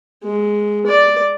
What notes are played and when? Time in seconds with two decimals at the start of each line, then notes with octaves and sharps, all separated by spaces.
0.24 G#3
0.86 D5